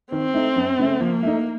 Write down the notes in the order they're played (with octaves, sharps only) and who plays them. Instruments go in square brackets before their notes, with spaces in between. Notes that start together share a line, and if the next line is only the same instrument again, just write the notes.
[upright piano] D#3 [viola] C4
[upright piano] A3 D#4
F#2
C#3 A3
[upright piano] F3 [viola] A#3
[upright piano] A3 D#4